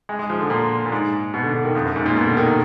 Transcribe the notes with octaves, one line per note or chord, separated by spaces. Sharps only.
G#3
G#3
F3
D3
A#2
A#2
G#2
B2
D3
D3
D#3
F2
F#2
G#2
A#2
B2
D3
D#3
D#3